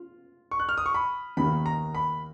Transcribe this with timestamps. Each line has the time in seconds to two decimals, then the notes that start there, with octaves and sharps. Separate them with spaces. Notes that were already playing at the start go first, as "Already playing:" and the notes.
Already playing: F4
0.51 C#6
0.60 F#6
0.69 F6
0.78 D#6
0.86 C#6
0.94 B5
1.37 D#2 D#3 A#3 B5
1.66 A#5
1.95 B5